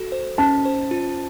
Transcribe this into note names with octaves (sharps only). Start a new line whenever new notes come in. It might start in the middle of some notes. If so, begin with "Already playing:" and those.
Already playing: F#4 A4
C5
C#4 A5
C5
F4